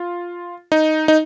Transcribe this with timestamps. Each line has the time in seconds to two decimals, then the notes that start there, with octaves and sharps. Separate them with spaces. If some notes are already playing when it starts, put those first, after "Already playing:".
Already playing: F4
0.72 D#4
1.08 D#4